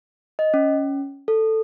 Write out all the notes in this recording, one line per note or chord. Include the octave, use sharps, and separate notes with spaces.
D#5
C#4
A4